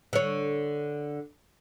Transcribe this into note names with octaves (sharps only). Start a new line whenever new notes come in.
D3 C#5